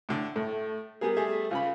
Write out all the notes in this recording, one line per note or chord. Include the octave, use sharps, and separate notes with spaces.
A2 D3
A2 A3
G3 B3 G#4 A#4
G3 A3 G#4 E5
C#2 C#3 F4 B5